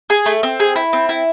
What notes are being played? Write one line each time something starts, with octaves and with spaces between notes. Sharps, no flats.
G#4
A3
C4
G#4
E4
C4
E4